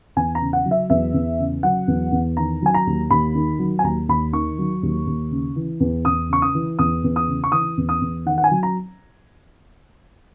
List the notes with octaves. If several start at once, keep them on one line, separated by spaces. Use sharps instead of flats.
E2 G#5
A#5
C#3
F#5
F#3
E5
E2 E5
E2
C#3
F#3 F#5
E2
E2
D#3 A#5
F#3 G#5
A#5
D#2
D#2 B5
D#3
F#3
G#5
D#2 A#5
D#2 B5
D#3 C#6
F#3
D#2
D#2
C#3
E3
E2
E2 D#6
C#3 C#6
D#6
E3
E2 D#6
E2
D#6
C#3
C#6
E3 D#6
E2
D#6
E2
D#3 F#5
F#5
G#5
F#3
A#5